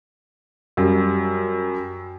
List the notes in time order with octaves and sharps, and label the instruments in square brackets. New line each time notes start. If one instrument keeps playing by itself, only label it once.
[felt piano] F#2 G3